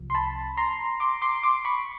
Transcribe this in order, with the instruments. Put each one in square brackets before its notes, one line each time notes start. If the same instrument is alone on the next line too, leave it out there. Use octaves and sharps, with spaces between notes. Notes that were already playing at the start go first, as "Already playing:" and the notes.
Already playing: [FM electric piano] C2 C3 F3
C6
A5 B5
A#5 C6
C6 D6
C6 D6
C6 D6
B5 C#6